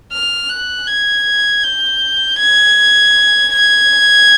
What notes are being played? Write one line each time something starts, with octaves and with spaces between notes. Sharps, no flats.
F6
F#6
G#6
G6
G#6
G#6